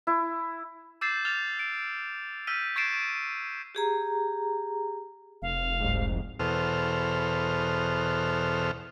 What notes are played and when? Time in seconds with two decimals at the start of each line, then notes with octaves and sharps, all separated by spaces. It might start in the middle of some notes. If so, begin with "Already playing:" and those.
0.07 E4
1.01 D6 E6 G6 A6 C7 E7
1.25 F6 A6 F7
1.59 D7
2.47 E6 F6 G6 B6 D#7
2.76 C#6 G#6 A6 C7 D7 E7
3.75 G4 G#4 A#5
5.42 F1 F5
5.79 C2 G#2
6.39 E2 B2 A4 C5 F6